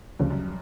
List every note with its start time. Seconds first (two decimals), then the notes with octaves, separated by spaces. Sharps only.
0.19 D2 G2 C#3 F3
0.30 F#2